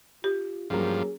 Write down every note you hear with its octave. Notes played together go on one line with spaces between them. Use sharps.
F4 G4
G2 F3 F#3 A#3 C#4 G#4